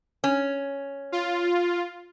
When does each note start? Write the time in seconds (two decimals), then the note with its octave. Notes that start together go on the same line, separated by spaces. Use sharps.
0.24 C#4
1.12 F4